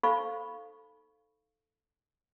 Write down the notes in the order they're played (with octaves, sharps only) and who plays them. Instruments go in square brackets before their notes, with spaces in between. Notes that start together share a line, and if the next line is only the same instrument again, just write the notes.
[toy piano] D#4 A4 C5 F5 B5 C#6